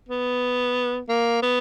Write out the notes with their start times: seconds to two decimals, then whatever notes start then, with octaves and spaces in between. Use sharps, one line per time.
0.09 B3
1.09 A#3
1.42 B3